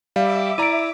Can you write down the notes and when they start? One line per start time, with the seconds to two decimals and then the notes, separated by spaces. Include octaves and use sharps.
0.16 G3 E5 F5 D6
0.58 E4 D5 A#5 D7 D#7